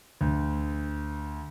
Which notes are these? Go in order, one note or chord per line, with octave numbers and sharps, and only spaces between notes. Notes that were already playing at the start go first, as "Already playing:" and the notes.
D2